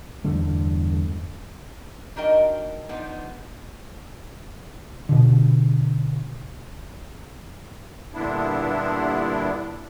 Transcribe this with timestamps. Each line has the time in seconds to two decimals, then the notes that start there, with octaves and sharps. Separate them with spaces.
0.24 E2 G2 D3 A3
2.16 D4 D#4 F#4 A#4 D#5 G5
2.89 F3 B3 D4 D#4
5.09 B2 D3
8.14 G2 A#2 D3 B3 D4 E4